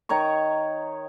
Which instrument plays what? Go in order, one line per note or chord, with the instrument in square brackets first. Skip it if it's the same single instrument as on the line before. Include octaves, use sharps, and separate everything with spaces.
[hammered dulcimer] D#3 C#5 A#5 C#6